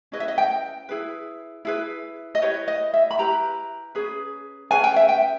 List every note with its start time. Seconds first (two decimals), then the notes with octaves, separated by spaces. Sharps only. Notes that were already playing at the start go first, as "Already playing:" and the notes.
0.12 C#4 E4 G#4 B4 D#5
0.20 E5
0.28 D#5
0.38 G5
0.89 E4 G#4 B4
1.65 E4 G#4 B4
2.35 D#5
2.42 E4 G4 B4 C#5
2.68 D#5
2.94 E5
3.11 B5
3.18 E4 G4 B4 A#5
3.95 C#4 G#4 B4
4.71 C#4 G#4 B4 G#5
4.84 G5
4.96 E5
5.09 G5